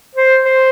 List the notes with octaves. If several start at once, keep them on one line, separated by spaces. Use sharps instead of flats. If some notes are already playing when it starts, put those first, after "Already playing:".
C5
C5